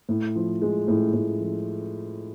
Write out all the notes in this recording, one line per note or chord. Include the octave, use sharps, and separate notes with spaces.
A2
F3
G#3
A2
A2
F3